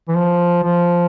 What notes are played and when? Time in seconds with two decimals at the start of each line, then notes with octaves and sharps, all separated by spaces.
0.08 E3
0.16 F3
0.63 F3